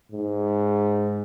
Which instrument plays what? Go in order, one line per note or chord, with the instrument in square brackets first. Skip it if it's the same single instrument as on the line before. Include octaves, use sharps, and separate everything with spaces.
[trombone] G#2